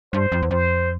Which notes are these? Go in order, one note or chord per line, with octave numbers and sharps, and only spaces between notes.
G2 C5
F2
E2
F2 C5